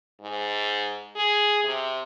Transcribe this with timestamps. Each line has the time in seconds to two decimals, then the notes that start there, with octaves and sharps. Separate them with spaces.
0.21 G#2
1.16 G#4
1.65 C3